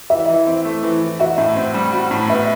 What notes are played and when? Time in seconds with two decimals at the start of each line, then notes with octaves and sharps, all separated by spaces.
0.10 E3 E5
0.29 E3
0.47 C4
0.65 A3
0.83 E3
1.02 E3
1.20 F#4 E5
1.38 A2
1.56 C4
1.74 G3
1.93 F#4
2.11 A2
2.29 B3 E5